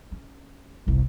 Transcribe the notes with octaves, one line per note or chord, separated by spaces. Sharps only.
C#4
G1 C2